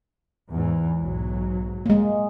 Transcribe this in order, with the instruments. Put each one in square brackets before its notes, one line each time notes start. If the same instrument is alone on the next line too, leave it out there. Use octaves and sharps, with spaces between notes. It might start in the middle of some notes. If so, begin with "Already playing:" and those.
[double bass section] E2 G#2 E3
B1 G#2 F#3
[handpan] G#3 A#3